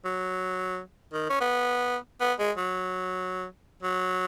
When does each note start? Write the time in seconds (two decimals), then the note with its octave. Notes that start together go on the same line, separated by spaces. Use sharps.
0.05 F#3
1.13 D#3
1.29 C#4
1.40 B3
2.21 B3
2.39 G#3
2.57 F#3
3.82 F#3